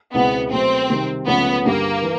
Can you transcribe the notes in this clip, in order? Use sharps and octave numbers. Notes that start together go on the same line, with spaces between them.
C#2 B2 G#3 B3 C4 E4
B2 F#3 A3 C4
C3 D#3 G3
C#2 C#3 F3 A3 B3 C#4
G2 D3 G3 A#3
E3